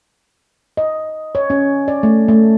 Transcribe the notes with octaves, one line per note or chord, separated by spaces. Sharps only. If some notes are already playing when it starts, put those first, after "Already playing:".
D#5
C#5
C#4
D5
A3
A3